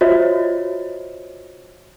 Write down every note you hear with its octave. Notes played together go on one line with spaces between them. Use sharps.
F4 F#4 C5 C#5 D#5 E5